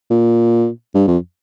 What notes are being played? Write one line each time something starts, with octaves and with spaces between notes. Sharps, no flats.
A#2
G2
F2